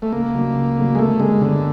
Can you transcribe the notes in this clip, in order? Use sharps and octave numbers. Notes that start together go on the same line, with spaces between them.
A3
C#2 A#3
C#3 F#3 A3 D4
C#2
C#3 F#3 A3 D4
G#3
G1 A3
G2 D3 G3 G#3 A#3
G1 D3